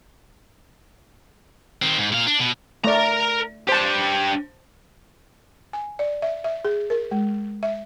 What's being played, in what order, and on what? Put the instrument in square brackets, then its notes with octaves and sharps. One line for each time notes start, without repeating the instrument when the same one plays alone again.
[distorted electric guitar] D#3 C4
G#2
A#2 F5
D4
B2
[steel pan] A3 D5 [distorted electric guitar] A#4 A#5
[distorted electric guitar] D4 G4 [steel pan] C5 A5
[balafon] G#5
D5
E5
E5
G#4
A#4
G#3
E5